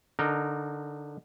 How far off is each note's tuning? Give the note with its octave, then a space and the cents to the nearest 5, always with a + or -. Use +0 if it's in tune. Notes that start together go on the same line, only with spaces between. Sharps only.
D3 -5 D#4 -20 A#4 +0